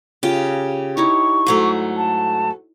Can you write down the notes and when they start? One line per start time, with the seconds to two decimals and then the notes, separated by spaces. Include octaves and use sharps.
0.23 C#3 F4 G4
0.97 D#4 E4 C#5 C#6
1.47 G#2 F#3 A3
1.97 A5